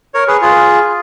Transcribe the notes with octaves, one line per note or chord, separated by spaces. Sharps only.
A#4 C#5
G#4 B4
F4 G#4